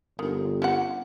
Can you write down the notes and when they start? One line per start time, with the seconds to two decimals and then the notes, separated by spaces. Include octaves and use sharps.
0.19 G1 D#3
0.62 C#4 D4 F#5